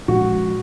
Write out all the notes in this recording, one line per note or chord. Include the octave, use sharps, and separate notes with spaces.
A#2 F3 G#3 C#4 F#4